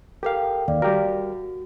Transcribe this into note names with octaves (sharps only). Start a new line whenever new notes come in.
G4 A4 A#4 F5 G5
D#2 D5 F5
G3 F#4 G4 A#4